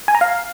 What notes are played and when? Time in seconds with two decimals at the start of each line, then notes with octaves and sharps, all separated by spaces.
0.08 G#5
0.15 A#5
0.21 F5